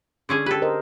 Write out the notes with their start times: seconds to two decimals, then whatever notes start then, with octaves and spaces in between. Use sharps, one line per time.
0.29 D3 C#4 G#4
0.46 G4 A4 B4
0.62 A#4 C5 D#5